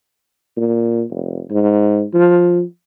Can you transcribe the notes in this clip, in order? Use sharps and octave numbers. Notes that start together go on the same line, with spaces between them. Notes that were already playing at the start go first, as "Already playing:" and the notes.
A#2
F1
G#2
F3